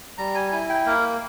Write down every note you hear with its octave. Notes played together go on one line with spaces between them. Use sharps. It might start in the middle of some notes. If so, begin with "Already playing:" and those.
G3 A#5
G#5
E4 G#5
G5
A#3 A#4